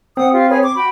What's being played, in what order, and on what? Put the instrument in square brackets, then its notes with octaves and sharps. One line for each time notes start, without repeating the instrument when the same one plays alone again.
[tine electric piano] C4 [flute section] F#5 D#6
[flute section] F4 G4
G#4 B4 C#5
C#6 D6
F#4 G5 B5